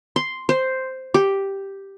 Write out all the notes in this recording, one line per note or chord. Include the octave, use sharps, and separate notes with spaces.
C6
C5
G4